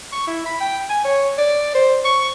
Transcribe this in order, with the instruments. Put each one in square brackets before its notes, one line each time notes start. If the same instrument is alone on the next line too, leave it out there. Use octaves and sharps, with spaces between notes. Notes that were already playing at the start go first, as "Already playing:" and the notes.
[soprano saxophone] C#6
E4
B5
G5
G#5
C#5
D5
C5
C#6